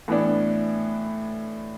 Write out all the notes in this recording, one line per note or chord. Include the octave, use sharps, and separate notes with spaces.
A2 E3 B3 D4